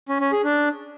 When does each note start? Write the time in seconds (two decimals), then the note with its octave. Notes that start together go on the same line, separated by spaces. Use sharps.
0.09 C#4
0.21 C#4
0.32 G#4
0.44 D4